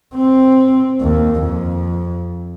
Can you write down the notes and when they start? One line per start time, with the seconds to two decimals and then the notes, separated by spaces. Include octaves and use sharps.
0.15 C4
1.01 D#2
1.40 F2